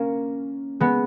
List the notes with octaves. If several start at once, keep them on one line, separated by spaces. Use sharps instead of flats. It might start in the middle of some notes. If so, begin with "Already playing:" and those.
Already playing: A#3 C#4
G#3 B3